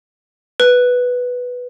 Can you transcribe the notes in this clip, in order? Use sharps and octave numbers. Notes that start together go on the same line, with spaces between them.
B4